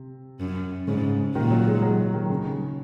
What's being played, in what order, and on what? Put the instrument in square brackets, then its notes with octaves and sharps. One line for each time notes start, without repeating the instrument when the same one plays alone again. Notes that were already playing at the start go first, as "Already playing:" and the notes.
Already playing: [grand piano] C3
[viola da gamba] F#2
[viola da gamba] G#2 [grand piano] C#3
[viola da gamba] A#2 [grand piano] D#3
[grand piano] F#3
G#3
F#3
D#3
C#3